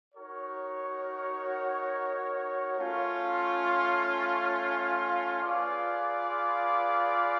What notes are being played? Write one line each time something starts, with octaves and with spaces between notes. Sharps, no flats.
D#4 F#4 A#4 C#5
A3 C#4 F4
F4 G#4 B4 D5 F5